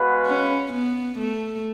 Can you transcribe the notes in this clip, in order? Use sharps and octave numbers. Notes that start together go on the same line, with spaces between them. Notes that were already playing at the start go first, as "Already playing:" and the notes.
Already playing: G#3 B3 F#4 B4 F5
C#4
B3
A3